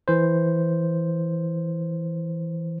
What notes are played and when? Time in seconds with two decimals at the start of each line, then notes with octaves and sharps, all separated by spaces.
0.08 E3 C5